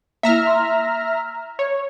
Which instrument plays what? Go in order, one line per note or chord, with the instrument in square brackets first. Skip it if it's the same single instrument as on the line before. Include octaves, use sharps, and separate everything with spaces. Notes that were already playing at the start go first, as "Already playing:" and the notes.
[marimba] A#3 E4 [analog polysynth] E5 A#5 F6
[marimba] C6
[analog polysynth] C#5